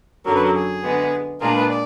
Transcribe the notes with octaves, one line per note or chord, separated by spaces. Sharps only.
F#2 D3 F#3 A#4
B4
A#4
G#4
D3 G#3 B3
A#2 G#3 D4 F4 G#4 A#4
B4
D5